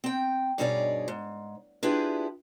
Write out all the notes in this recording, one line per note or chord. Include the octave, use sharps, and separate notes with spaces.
C4 G5
G2 B2 D#4 G#4 C#5 D5
G#2
D4 E4 F4 G4 G#4 B4